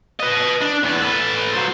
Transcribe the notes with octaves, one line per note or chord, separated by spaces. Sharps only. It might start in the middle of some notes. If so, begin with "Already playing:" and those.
B4 D#5
D4
E2 B3
A4 B4
F#3 C5